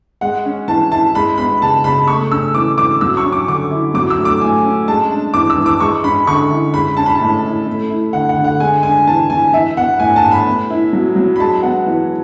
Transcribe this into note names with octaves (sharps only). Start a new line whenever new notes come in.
G#3 F#5
C#4
E3 A5
E4 A5
G#3 B5
B3 B5
C#3 A5
C#3 B5
A3 C#6
C#4 E6
E3 D6
E3 D6
F#3 E6
C#6
C#4
D6
D3 D6
E4
F#3 D6
E6
A3
D6
A2 G#5
C#4
G#3 A5
D4
E3 D6
E6
E3
D6
G#3 C#6
C#4 B5
D3 C#6
E4
G#3 B5
C#4 A5
B5
A5
A2
E4
A3
E4
D3 F#5
F#5
D3
F#5
G#3 G#5
D4 G#5
E3 A5
E3 G#5
E3 E5
B3 F#5
A2 G#5
A5
A2
B5
B3
E4
F#3
F#3
B5
G#3 A5
B3 F#5
E3